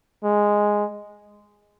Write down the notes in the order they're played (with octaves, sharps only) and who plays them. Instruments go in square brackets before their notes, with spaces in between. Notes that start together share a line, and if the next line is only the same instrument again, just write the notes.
[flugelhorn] G#3